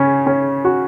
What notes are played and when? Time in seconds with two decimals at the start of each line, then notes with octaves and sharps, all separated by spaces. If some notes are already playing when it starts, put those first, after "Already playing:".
Already playing: C#3 C#4
0.26 C#4
0.65 F#4